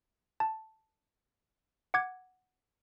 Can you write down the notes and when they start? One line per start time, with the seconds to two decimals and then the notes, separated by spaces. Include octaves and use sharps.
0.40 A5
1.94 F#5 D6 G#6